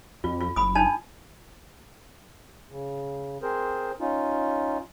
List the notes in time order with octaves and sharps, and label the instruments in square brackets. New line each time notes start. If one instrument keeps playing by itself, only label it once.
[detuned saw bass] F2 [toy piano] F4
[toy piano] F4
[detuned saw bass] F#1 [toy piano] B5 D#6
[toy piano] D4 D#4 A5
[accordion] C#3
C4 G#4 A#4 C5
C#4 D#4 F4